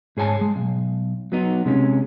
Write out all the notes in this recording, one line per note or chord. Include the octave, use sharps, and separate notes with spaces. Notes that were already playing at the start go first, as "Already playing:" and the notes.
G#2 G#4 C#5 G#5 A5
G#3
B1
F#3 B3 D#4
C3 G#3 C#4